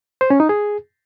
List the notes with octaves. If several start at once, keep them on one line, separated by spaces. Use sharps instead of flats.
C5
C#4
D#4
G#4